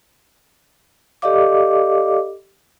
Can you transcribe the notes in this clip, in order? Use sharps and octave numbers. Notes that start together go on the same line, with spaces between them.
G4 A4 D5 D#5 F5 D6